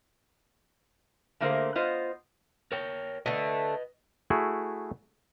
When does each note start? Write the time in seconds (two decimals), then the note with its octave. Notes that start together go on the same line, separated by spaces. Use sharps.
1.40 D3 A3 A#3 G#4 A#4 C5
1.75 B3 F4 C5 D#5
2.72 A#4 C#5 G5
3.26 D3 A3 B4 D#5
4.30 A3 E4 F#4 G#4